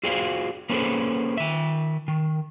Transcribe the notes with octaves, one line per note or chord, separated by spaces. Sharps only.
F4 F#4 G#4 C5 D5 F5
A#3 C#4 G#4 A4 B4 C5
D#3 E5
D#3